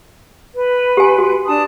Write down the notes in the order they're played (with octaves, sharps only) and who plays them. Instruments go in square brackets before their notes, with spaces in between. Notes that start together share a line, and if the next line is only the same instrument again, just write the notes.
[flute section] B4
[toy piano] G4 G#5
F#4
[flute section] D4 A5 D#6